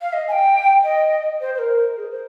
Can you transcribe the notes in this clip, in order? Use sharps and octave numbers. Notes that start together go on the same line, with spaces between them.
F5
D#5
G#5
G5
D#5
C5
C5
A#4
G#4
C5